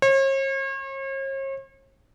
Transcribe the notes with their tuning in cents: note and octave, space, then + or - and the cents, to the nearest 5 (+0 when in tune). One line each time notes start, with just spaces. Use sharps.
C#5 -45